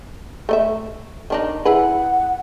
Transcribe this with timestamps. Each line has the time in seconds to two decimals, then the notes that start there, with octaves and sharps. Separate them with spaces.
0.49 A3 D#5 E5
1.30 D#3 D4 D#4
1.65 E4 G#4 B4 F#5